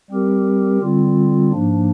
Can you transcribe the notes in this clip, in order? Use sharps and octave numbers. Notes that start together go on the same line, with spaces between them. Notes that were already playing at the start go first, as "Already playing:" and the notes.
G3 C4 G4 A#4
D3 G3 C4 F4
G#2 F3 A#3 D4